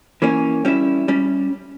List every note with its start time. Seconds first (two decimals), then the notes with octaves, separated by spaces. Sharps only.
0.22 E3 A#3 C#4
0.65 G3 C#4 E4
1.08 G3 C#4